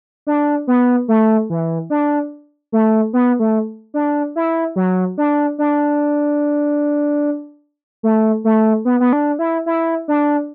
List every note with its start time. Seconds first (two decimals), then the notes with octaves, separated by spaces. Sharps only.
0.27 D4
0.67 B3
1.08 A3
1.50 E3
1.90 D4
2.72 A3
3.13 B3
3.39 A3
3.94 D4
4.36 E4
4.76 F#3
5.18 D4
5.58 D4
8.03 A3
8.44 A3
8.85 B3
9.00 B3
9.13 D4
9.39 E4
9.66 E4
10.08 D4